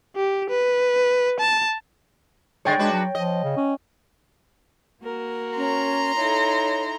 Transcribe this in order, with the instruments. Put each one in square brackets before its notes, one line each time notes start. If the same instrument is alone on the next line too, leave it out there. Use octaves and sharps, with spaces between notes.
[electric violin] G4
B4
A5
[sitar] D3 G#3 G#4 [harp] C#5 G5 A6
[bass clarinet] G#3 [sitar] D4 F#4 B4
[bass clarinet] F#3
[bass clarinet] F3 [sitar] D#5
[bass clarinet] C#3
C#4
[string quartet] A#3 F#4 A#4
[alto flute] C#4 [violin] A#5 C6
[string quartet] D#4 E4 A4 [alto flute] C#5